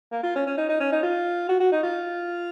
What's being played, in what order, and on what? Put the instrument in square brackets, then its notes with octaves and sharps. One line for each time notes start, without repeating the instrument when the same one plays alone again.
[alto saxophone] A#3
F4
C#4
C#4
D#4
D#4
C#4
D#4
F4
F#4
F#4
D#4
F4